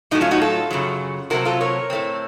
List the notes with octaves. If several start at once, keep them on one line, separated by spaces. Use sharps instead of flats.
A2 F#3 A3 D#4
C#4 F4
D#4 F#4
F4 A4
F#2 C#3 F#3
C3 F#3 A3 C4 F#4 A#4
F4 A4
A#4 C#5
A2 A3 C4